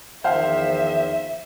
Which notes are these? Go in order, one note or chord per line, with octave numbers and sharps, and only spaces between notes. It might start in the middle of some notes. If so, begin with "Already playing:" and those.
E2 D#3 F3 C5 E5 F5